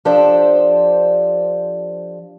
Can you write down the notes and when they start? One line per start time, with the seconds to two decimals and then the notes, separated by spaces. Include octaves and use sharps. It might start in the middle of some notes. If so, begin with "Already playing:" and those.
0.05 F3 D4 G4 A4 C5 D5